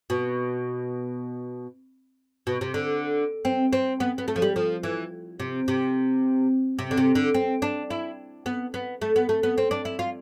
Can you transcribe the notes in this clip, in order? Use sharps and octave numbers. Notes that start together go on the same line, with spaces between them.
B2
B2
C3
D3
C4
C4
B3
B3
A3
F3
G3
F3
E3
C3
C3
C3
D3
C3
D3
C4
D4
E4
B3
B3
A3
B3
A3
B3
C4
D4
E4
F4